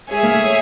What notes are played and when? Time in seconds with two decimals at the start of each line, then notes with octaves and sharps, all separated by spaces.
0.10 G#3 G#4 C#5 E5 G#5
0.23 A#3
0.32 A3